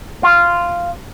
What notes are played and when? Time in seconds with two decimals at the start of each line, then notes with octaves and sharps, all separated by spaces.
0.23 F4